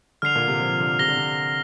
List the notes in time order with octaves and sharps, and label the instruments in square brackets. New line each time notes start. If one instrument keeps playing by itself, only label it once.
[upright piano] D3 [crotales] F6 C7 F7
[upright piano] A#2
C3
F3
D3
[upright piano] C3 [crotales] A#6 G7
[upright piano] D3
C3